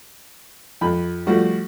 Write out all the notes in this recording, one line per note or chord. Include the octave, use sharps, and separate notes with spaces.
F2 B5
F3 G3 A3 F#4